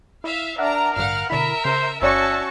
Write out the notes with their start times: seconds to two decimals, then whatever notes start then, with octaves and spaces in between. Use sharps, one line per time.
0.24 E4 E5 F5
0.58 D4 A#4 E5 F#5 A#5
0.96 A1 G2 D3 F5 F#5 F6
1.30 B2 D3 E4 A#4 E5 B5
1.65 C#3 C5
2.01 G1 C#4 F#4 C#5 D5 E5 A5 C#6